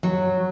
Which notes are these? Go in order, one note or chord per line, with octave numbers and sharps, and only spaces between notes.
F#3